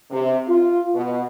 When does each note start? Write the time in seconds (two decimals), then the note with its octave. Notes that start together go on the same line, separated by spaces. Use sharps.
0.11 C3
0.47 F4
0.94 B2